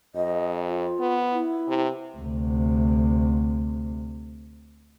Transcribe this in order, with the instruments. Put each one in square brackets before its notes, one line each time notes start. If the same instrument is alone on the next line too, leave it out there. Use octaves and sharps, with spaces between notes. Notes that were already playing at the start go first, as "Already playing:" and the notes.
[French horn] F2 [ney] D#5
[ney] F4
[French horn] B3
[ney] E4
[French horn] C3
[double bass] D2 C3